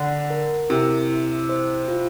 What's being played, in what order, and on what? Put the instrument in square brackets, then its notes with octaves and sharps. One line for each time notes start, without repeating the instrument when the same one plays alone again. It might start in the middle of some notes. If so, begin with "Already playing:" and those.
Already playing: [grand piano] D3 [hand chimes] F#5
[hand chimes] A#4
[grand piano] C3 [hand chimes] E4
[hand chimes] E4
C5
F4